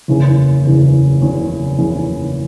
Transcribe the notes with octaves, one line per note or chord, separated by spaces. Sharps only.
F#1 E2 C#3
F#1 E2 C#3
F#1 E2 C#3
F#1 E2 C#3